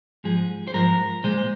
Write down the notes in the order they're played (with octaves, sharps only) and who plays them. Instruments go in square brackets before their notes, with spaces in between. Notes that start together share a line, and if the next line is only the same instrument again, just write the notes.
[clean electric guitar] G#2 F3 G#3 G#4
C5
G#2 F3 G#3 A#4
A#2 G#3 C5